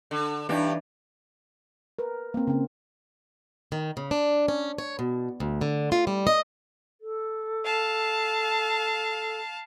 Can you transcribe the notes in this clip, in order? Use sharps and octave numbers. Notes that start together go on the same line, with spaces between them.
D3
G2 E3 D4 D#4 G4
A#4 B4
A#3 C4
C#3 C4
D#3
C#3
D4
C#4
C#5
B2
D2
D3
F4
G3
D#5
A4
F5 A5